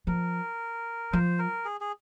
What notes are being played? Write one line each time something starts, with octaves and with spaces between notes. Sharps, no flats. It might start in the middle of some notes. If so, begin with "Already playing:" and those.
F3 A#4
F3 C5
A#4
G#4
G#4